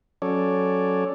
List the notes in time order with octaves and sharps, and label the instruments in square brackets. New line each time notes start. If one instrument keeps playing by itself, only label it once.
[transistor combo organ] F#3 C#4 A4 C#5 D5